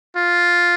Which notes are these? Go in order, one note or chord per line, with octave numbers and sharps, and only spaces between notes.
F4